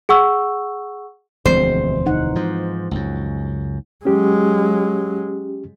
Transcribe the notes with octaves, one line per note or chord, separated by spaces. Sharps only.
G#4 F#5 C#6 E6
E1 D2 F3 G#3 C4 C5
E3 D#4 F#5
G#2 F3
C#2 F#2
F#3 G#3 C#4 G4